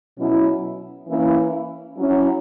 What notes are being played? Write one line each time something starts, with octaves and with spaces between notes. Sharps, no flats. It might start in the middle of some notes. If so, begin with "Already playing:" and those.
B2 F#3 C#4 E4
E3 A#3 C#4 E4
F#3 C#4 E4